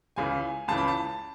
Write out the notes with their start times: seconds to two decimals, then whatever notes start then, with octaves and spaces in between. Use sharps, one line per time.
0.16 C#2 C#3 E3 G#5
0.68 C#2 C#3 E3 A5
0.78 B5
0.88 A5